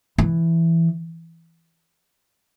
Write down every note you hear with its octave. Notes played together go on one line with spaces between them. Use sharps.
E3